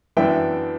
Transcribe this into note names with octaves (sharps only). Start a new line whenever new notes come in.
F#2 E3 B3 D4 E5 G5